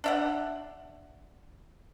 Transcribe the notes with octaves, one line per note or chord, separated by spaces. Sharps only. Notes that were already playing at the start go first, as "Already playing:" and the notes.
D4 E5 F#5